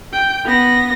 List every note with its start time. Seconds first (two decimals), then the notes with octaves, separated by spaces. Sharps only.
0.13 G5
0.45 B3 A#6